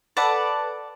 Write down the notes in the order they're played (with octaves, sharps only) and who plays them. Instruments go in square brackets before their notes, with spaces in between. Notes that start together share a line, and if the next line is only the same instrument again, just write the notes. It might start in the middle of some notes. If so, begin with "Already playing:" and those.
[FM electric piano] A4 B4 A5 [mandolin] D5 F#5